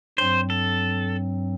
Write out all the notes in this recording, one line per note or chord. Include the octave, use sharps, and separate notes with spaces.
G2 F#3 C4 C5
A4